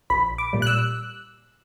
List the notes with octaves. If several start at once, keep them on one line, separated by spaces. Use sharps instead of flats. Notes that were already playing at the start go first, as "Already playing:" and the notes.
A#1 B5
D6
A#2 G3
F#6
E6